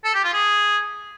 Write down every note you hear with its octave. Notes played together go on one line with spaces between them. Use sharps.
A4
G4
F4
G#4